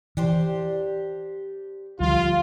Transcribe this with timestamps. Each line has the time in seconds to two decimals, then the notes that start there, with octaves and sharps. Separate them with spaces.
0.17 E3 D4 G4 C5
2.00 D2 F3 G3 F4